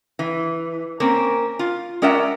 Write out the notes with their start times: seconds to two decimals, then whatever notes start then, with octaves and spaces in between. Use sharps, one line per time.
0.19 E3
1.00 A#3 C4 C#4 A#4
1.59 F4
2.02 G#3 C#4 A#4 D5 E5 F#5